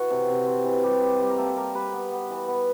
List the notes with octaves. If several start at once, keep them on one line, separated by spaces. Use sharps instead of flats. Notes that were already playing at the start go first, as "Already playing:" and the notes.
Already playing: E3 F#4
C3
C3
C4
E3
G3 G4
G3
G3
A#4
A#3 A4
G3 A#4
G3 B4
B3
B3
E3
B3